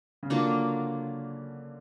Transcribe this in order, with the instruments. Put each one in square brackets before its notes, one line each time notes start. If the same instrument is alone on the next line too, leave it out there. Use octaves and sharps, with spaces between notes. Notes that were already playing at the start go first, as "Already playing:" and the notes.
[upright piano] C#3
[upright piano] D3 [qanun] F#3 A#3 D4 F4